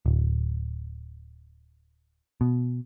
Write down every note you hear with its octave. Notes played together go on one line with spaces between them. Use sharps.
D1
B2